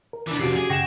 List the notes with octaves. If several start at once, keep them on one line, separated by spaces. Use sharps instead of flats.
A#4
E3 D4 D6
F2 C3 C#4 F#4 G4 C7 D7
G#4
F#2 C#3 F#5 G5 C#6 A#6 E7